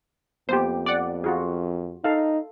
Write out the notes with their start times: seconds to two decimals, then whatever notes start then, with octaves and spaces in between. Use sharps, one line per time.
0.49 F2 A#3 B3 G4 C5
0.86 D5 F#5
1.24 F4 F#4 G#4
2.04 D#4 A4 F5